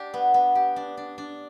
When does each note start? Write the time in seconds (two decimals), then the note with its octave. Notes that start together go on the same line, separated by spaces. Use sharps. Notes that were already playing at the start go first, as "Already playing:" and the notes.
Already playing: D4 G4
0.14 B3
0.34 B3
0.55 G4
0.76 D4
0.97 D4
1.18 D4